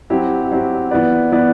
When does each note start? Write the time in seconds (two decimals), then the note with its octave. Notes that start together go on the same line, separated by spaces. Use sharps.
0.10 F#3 C4 E4 G4
0.51 F#3 C4 E4 G4
0.91 E3 B3 E4 B4 D5
1.32 E3 B3 E4 B4 D5